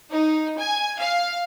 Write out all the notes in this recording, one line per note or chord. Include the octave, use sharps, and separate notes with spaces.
D#4
G#5
F5